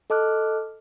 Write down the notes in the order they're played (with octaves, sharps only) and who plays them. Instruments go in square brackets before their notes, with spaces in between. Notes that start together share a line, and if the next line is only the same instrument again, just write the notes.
[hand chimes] A4 D#5 A5 D6 F6 F#6